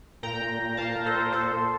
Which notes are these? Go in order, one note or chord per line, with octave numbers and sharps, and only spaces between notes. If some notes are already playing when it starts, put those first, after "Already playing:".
A#2 G5 A#5
A#2
A#2
A#2 F5 A5
A#2
A4 C5
A#2
A#2 A4 C5
A#2